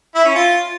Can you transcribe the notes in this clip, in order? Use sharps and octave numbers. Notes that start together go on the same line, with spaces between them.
E4
C#4
F4